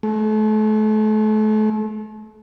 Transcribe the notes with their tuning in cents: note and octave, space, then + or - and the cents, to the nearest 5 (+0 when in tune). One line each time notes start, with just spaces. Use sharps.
A3 -35